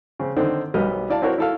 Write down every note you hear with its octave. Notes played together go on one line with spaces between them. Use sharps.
C#3 C4
D3 D#3 C4 D4 A4
B1 G3 B3 A#4 D#5 F6
E4 D5 F5 A5
C4 E4 F#4 A#4 C#5 D5
E4 A4 F5